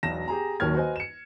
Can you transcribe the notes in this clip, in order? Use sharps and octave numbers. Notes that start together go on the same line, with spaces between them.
E1 B1 A#6 E7
G4 G#4 A#5
D#1 D#2 D#3 F#3 F6 G#6
F#4 B4 C5 D#5 G#5
C#7 E7